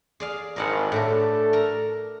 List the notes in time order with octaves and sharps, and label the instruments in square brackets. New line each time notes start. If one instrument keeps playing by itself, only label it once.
[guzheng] G#4 D5 F5
[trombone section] G#1 [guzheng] A#4 D5 F#5
[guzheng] A2 F#4 G4 [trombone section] A3 D4 A4
[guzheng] A#4 A#5